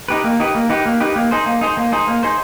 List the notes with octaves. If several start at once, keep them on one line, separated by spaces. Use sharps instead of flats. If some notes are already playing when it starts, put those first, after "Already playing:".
D#4 G4 B4
A#3
D#4 G4 B4
A#3
D#4 G4 B4
A#3
D#4 G4 B4
A#3
D#4 G#4 C5
A#3
D#4 G#4 C5
A#3
D#4 G#4 C5
A#3
D#4 G#4 C5